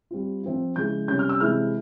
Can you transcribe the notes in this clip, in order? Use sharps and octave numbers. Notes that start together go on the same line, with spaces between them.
G3 C4 F4
F3 C4 F4
C#3 F3 G#3 E4 G6
C3 G3 C#4 G6
F6
E6
C3 E3 G#3 E4 F6